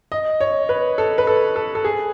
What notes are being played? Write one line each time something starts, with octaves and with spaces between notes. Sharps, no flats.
D#5
C#5
B4
A4
B4
A4
A4
A4
G#4